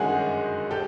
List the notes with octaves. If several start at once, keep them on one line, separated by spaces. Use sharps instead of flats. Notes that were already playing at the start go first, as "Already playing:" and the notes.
Already playing: G1 F#2 D#3 G#3 F#4 G#4
G4 A4